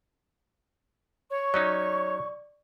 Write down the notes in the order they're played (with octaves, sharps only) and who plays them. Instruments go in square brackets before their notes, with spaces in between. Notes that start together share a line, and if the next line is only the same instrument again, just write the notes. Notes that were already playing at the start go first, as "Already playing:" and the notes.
[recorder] C#5 [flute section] C#6
[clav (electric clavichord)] F#3 C#4 D#4 [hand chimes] D5